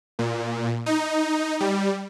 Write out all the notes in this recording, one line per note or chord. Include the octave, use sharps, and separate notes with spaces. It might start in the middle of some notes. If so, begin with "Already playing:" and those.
A#2
D#4
G3